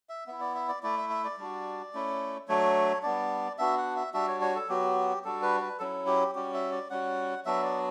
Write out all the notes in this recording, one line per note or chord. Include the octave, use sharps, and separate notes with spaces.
E5
B3 E4 E5
D5
E5
D5
A3 E4 D5
E5
E5
D5
G3 D4 F#4
A3 C#4 E4
F#3 A3 D4 C#5
G3 B3 D4 D5
B3 D4 F#4 E5
F#5
E5
G3 D4 F#4 E5
C#5
C#5
A4
F#3 B3 F#4 G4
G3 D4 F#4 A4
B4
B4
F#3 C#4 E4 A4
G4
G3 C#4 F#4 G4
E5
D5
G3 C#4 F#4 F#5
F#3 B3 D4 F#4 E5
D5